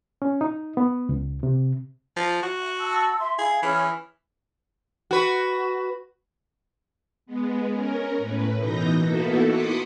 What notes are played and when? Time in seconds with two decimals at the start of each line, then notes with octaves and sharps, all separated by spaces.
0.22 C#4
0.41 D#4
0.77 B3
1.09 C#2
1.43 C3
2.16 F3
2.43 F#4
2.80 A5 E6
3.18 E5 C6
3.38 E4 G#4 F5
3.62 E3 C#4 G#4 F6
5.11 F#4 B4
7.26 G#3 B3
7.71 C#4 A#4
8.17 A2 B4
8.60 B2 E3 D#4 G6 A#6
9.00 A#3 B3 D#4 E4 F#4 A4
9.47 B5 C6 D6 D#6 B6 C#7